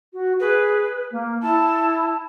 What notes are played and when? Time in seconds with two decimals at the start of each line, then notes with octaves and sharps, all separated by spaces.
0.13 F#4
0.40 G#4 B4
1.12 A#3
1.42 E4 A5